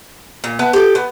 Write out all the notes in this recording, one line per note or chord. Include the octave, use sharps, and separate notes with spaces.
A#2
B3 B4 E5 A5
G4 A4
B3